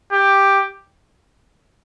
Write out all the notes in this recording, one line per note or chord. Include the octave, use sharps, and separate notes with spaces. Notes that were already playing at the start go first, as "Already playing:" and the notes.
G4